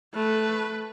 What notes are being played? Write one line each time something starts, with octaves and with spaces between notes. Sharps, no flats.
A3 B4